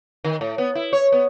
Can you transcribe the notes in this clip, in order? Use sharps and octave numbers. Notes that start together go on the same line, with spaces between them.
D#3
A2
B3
E4
C#5
B3